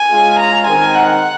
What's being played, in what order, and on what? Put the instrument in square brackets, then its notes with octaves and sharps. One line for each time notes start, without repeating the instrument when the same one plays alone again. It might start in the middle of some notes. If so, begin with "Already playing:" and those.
Already playing: [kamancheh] G#5
[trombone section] G#3 C#4 F4 G#4
[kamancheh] A#5
[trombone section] D#3 G#3 C4 D#4 A#4 [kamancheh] G#5
[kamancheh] F#5